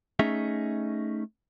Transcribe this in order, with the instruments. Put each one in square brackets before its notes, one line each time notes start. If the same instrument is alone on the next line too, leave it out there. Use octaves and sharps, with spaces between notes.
[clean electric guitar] A3 C#4 D#4 G#4 E5